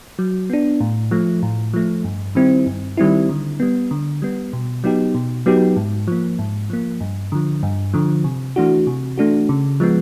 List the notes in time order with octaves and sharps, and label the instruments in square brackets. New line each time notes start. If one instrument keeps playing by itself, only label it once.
[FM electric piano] F#3
B3 D4
A2
F3 A3
A2
F3 A3
G2
D#3 G3 C4 E4
G2
D#3 G3 C4 E4
D3
G3 B3
D3
G3 B3
B2
F#3 B3 D#4 G4
B2
F#3 B3 D#4 G4
G#2
F3 A#3
G#2
F3 A#3
G2
D3 F3
G2
D3 F3
C3
E3 A3 D4 F#4
C3
E3 A3 D4 F#4
C#3
F3 G#3 B3